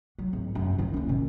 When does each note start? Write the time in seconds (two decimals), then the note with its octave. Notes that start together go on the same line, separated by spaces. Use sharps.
0.19 F#3
0.33 G#1
0.55 F#2
0.78 D#3 E4
0.94 D#1 C#4
1.09 A#2 D#3